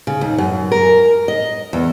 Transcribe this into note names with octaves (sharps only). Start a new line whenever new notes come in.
C#3
D#2
F#2
A#4
D#5
E2